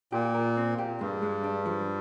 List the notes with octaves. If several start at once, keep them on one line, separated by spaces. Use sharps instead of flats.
A#2 G4
A#4
C4
G4
G2 G#3
G#3
D4
F3